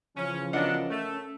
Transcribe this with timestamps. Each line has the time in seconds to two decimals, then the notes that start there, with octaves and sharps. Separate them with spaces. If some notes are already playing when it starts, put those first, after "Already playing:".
0.17 C#3 E3 F3 C#4
0.53 F#3 B3 C#4 D4 A#4 D#5 F#5
0.90 A3